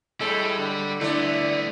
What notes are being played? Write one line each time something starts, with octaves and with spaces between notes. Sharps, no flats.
A2 G3 G#3 A4
D3
D3 A3 B3 E4 D5